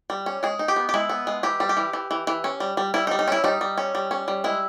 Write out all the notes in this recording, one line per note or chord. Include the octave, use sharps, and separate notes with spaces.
G3
C#4
G#3 G#4
D#4
G4
B3
G4
G#3 E4
B3
G#3
E3 G4
G3
G4
E3
E3
E3
E3
C#4
G3
G3
G3 E4
D#4
G3
D#4
C#4 E4
G3 D#4
G3
C#4
G3
C#4
G3
G#3 E4